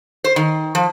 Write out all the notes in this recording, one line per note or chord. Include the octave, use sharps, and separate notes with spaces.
C5
D#3
F3